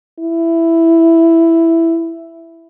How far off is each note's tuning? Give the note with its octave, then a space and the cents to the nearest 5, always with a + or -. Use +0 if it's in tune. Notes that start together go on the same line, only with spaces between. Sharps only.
E4 +5